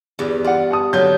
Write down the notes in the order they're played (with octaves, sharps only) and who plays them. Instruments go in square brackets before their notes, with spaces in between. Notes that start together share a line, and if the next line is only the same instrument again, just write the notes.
[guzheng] E2 G2 B3
[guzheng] F4 [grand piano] D5 F#5
[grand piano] F#5 A5 D#6
[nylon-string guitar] D3 F#3 [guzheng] D#4 F4 B4 [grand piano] G6